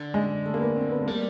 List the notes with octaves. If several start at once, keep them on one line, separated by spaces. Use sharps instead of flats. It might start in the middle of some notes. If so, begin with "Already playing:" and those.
Already playing: D3
G#3
A3
A#3
B3
C4
B3
A3
G3 A#3